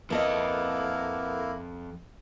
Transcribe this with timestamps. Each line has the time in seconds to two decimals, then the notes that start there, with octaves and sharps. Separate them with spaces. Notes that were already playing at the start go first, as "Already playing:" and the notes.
0.10 F2 A#3 B3 E4 A4 A#4 D#5